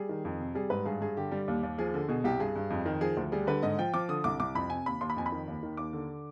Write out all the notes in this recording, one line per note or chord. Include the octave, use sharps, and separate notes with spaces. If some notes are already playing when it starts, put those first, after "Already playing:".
Already playing: G3 G#4
D#3
F2
C3
G3 G#4
G#2 B4
G2 G#4
G2 G#4
D3 G4
G3
D#2
D#2
F3 G#4
D3
B2 G#4
C2 G4
G2 G#4
G2
F2
D#3
F3 G#4
D2
G3 G#4
D3 B4
G#2 D#5
F3 G5
F3 D6
D3 D#6
C2 D6
C2 D6
F2 B5
C3 G#5
D#2 B5
D#2 C6
B5
F2 G#5
B5
D#3
D#2
D#3
D#2 D6
D3